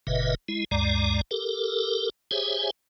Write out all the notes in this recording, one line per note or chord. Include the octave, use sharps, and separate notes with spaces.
F#1 A#2 C#3 B4 D#5 E5
G#3 E4
D2 G2 G#3 D5 A#5
G4 A4 A#4
G4 G#4 C5 C#5 E5 G#5